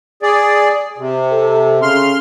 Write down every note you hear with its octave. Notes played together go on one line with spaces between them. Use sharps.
G#4 D5
C3
A4
C#3 C6 F6